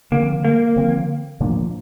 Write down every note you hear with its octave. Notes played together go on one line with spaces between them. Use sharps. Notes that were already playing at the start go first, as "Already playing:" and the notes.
D3 F3 A#3 C4
A#3
D3 F3 C4
A2 F3 A#3 D4